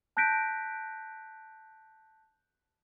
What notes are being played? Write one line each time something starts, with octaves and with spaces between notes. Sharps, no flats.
A5 F#6 G6 A#6 B6 D7